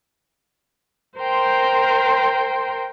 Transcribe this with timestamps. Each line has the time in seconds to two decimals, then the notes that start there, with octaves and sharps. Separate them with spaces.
1.19 A#4 C5 G5 C6